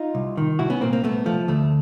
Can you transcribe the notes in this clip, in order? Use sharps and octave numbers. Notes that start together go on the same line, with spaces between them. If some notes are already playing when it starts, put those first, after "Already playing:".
Already playing: D#4 F4
C2
D#3
C2 E4 F#4
B3 C#4
A#2 A#3 C4
A#3 C4
C2 A3 B3
F3 A3
D2 A3